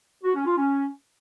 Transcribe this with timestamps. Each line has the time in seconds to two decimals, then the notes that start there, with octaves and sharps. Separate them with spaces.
0.24 F#4
0.35 C#4
0.46 F4
0.57 C#4